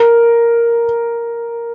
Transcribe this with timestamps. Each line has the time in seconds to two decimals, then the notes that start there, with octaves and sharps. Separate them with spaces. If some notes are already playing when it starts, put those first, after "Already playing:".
Already playing: A#4